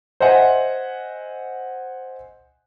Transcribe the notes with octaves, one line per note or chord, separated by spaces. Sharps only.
C5 D#5 E5 F#5 G#5